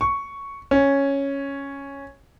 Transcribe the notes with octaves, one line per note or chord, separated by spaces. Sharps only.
C#6
C#4